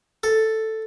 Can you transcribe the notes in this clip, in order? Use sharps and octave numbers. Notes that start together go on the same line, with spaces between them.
A4